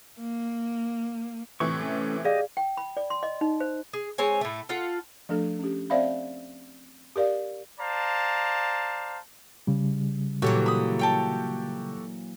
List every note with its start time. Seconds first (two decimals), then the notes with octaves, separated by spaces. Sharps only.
0.18 A#3
1.60 A2 C3 E3 C#6
1.81 A3 C#4
2.25 G4 G#4 D5 D#5 F5
2.57 G5
2.77 B5
2.97 D5
3.10 C6
3.23 D#5
3.41 D#4
3.60 C5
3.93 G#4
4.18 G#3 C4 C#5 G#5
4.41 A2 A3
4.69 F4 A4 F#5
5.29 F3 A3 D4 A4
5.59 C#4 G4
5.90 C4 C5 D5 E5 F5 B5
7.16 G4 A#4 D5 F5
7.80 C5 D5 F5 A5 A#5
9.67 C#3 G3
10.42 A#2 E3 F#3 F#4 G4 A4 C#5
10.66 B5 D#6
10.99 C#5 G5 A5